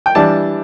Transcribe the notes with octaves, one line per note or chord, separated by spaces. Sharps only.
G5
E3 G3 D4 A5